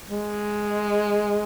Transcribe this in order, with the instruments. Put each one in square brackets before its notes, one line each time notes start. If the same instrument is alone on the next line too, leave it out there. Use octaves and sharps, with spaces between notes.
[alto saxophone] G#3